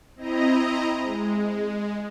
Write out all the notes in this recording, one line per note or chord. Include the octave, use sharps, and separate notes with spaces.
C4 E4 D#5 A#5
G#3